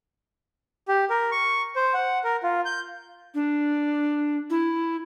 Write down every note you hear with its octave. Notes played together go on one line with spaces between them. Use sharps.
G4
A#4
C#6
C5
F#5
A#4
F4
G6
D4
E4